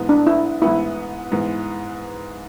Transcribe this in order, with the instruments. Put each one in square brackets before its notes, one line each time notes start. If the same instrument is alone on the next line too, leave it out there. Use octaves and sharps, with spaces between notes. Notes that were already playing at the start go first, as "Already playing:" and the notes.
Already playing: [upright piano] G#2 E3 B3
[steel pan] D4
E4
[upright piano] G#2 E3 B3 [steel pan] E4
[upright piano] G#2 E3 B3